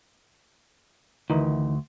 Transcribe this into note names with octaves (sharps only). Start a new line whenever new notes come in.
D2 D#3 E3 D#4